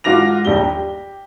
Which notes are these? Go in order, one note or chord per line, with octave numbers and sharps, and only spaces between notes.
G#2 F4 F#4 D6 A#6 F7
A#1 D#2 G3 G4 G7
G4